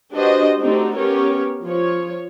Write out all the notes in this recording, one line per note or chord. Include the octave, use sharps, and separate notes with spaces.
D4 F#4 G4 B4 C5 D#5
A3 C4 D4 D#4 F#4 G4
B3 C#4 G4 A#4 C#5
F3 C#5